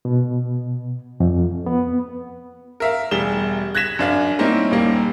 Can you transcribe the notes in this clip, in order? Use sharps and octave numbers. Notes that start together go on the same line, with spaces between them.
B2
F2
B3
A#4 E5 F5
E1 G3 G#4 E7 G7
F#6 G#6 A#6 B6 E7
F#2 D4 F5
G3 A#3 C4 C#4 D#4 E4
D#1 G3 A#3